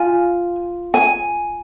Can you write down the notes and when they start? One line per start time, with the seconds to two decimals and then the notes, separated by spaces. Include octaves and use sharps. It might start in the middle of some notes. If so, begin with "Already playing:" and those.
Already playing: F4 G#5
0.94 G#5